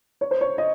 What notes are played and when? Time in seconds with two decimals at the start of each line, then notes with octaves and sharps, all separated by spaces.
0.21 C#5
0.31 C5
0.41 C#5
0.58 D#5